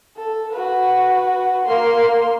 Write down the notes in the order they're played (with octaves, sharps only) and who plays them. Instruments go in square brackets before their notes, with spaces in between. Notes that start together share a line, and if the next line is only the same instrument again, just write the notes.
[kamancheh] A4
F#4 B4
A#3 C6